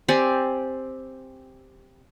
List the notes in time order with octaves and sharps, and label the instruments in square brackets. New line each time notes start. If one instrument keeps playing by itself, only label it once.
[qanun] C4 G4 D5 G#5